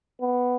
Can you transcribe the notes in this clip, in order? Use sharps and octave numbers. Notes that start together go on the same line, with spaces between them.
B3